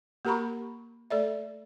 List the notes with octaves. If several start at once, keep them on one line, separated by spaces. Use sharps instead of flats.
A#3 G4 A#4 A#5 B5 C#6
A3 A4 D5 E5